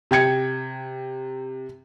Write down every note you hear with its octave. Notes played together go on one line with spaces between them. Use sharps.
C3 G5 G#6 C#7